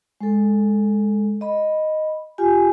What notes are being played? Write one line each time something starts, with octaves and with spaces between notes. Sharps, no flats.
G#3 A4
D#5 B5
F4 G4 G#5